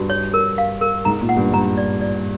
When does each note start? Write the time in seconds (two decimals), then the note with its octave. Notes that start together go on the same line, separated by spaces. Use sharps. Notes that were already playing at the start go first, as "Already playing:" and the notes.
Already playing: G2 F#4
0.10 C#5
0.34 A#4
0.58 F5
0.81 A#4
1.05 G#2 A#5
1.21 A#2
1.29 F#5
1.37 G2
1.53 G2 A#5
1.77 D5
2.01 D5